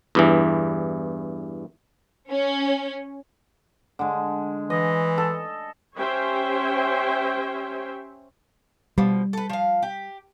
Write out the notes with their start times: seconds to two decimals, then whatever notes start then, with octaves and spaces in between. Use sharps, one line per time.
0.15 E2 G2 E3
2.30 C#4
3.99 D3 G#3
4.70 E3 D#5
5.18 A4
5.97 C#4 G4 C5 C#5 E5 G5
8.98 B2 F3 G3
9.33 A4 B4
9.50 F3 F5
9.83 G4